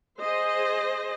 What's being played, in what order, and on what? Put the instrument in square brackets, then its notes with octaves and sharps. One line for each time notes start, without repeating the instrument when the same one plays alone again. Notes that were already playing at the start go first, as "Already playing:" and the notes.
[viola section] G#4 C5 D#5